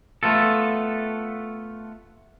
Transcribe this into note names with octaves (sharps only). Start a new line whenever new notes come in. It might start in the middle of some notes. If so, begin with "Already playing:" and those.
A3 B3 F4 A4